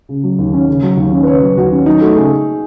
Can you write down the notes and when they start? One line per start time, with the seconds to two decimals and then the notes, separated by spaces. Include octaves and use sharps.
0.09 C#3
0.23 F#3
0.38 D#2
0.53 C#4
0.68 C#3
0.83 F#3
0.97 D#2
1.12 C#4
1.23 B4
1.27 C#3 C#5
1.41 F#3
1.57 D#2 F#4
1.72 C#4
1.86 F#3 D#4
2.01 A3 F#4
2.16 C#3 G#4